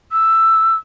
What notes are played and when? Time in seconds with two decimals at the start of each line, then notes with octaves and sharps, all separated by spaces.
0.12 E6